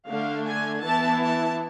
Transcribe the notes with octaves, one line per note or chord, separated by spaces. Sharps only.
D3 A3 D4 F5
G#5
E3 B3 E4 A5
A5